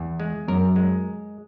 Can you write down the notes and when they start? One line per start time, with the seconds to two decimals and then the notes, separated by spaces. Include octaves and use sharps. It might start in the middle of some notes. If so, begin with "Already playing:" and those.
Already playing: E2
0.20 G#3
0.48 F#2 A#4
0.76 G#3